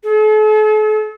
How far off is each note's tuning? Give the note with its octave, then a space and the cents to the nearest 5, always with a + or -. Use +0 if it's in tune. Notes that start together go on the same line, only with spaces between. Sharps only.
A4 -45